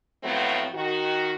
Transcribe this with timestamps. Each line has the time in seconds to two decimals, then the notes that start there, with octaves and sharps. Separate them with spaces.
0.23 A2 F3 F#3 A3 B3 C4
0.74 D#3 F#4